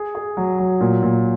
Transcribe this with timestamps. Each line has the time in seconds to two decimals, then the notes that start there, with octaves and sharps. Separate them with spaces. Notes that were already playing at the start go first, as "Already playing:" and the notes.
Already playing: G#4
0.15 G#4
0.37 F#3
0.59 F#3
0.81 A#2
1.03 A#2